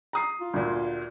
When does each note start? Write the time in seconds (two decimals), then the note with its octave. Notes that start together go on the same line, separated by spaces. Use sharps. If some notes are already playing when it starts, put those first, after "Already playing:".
0.13 A#5 D#6 C7
0.41 F4
0.53 D2 A#2